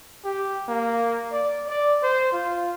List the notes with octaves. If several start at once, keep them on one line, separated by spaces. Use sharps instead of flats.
G4
A#3
D5
D5
C5
F4